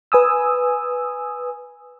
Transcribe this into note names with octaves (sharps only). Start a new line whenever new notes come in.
B4 G#5 D#6 E6